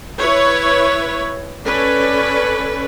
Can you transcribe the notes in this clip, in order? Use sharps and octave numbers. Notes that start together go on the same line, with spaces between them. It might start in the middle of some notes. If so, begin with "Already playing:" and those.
E4 B4 C#5
C#4 A4 B4 D5